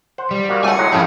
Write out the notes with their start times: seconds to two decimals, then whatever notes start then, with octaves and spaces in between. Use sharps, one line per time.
0.18 C5 F#5
0.31 G3
0.49 D#3 A#3 F#4
0.64 C#2 A3 F#5 G#5
0.78 A2 F#3 G#3
0.92 F2 A2 C#3 C#4